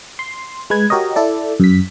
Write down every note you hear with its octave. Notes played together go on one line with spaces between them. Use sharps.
C6
G#3 B4 G#6
F#4 G4 A#4 C#5 D#5
E4 A4 D5
F#2 B6